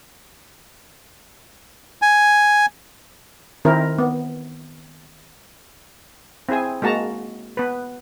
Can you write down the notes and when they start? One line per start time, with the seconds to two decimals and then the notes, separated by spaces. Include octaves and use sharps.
2.02 G#5
3.65 D#3 C4 E4 A#4
3.98 B3
6.49 C4 E4 G#4 C5 G#5
6.82 G#3 A#3 F#4 A5 A#5
7.57 B3 B4